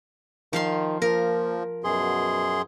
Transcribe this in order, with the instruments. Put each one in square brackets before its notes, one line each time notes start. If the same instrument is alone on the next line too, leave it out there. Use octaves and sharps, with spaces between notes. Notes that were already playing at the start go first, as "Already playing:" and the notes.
[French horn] D#3 [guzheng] F3 F5 C6
[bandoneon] F3 [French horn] A#3 [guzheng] A#4
[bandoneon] F#2 G#4 C6 [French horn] B2